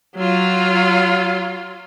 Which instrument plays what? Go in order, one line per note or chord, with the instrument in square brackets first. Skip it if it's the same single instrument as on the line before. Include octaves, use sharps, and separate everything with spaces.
[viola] F#3 F4